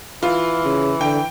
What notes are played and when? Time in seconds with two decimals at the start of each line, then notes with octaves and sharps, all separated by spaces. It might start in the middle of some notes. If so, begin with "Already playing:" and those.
0.23 E3 F4
0.65 C#3
1.01 D3 G5